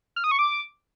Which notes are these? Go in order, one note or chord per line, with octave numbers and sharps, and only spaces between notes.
F6
D#6
C#6
D6